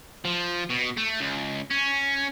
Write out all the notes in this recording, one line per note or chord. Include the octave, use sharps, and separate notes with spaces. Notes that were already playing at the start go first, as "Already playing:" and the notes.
F3
B2
A3
C#2
C#4